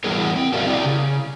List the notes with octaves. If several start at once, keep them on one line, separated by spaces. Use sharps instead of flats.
E3 G3 B3 E4 G#4 A#4
C4
F#4 G#4 A#4 D5 E5 F5
C4 E4 G4 D5
C#3